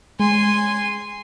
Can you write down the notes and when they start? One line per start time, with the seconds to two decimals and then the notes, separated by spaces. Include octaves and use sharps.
0.20 G#3 G#5 C6